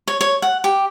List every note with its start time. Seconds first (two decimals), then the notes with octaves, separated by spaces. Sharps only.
0.08 C#5
0.21 C#5
0.42 F#5
0.64 G4